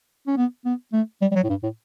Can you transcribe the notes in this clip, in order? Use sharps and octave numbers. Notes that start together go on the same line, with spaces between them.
C#4
B3
B3
A3
G3
G3
F#3
A2
G2
A2